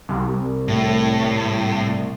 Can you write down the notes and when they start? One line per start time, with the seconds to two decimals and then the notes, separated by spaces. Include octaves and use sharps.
0.09 C2
0.68 A2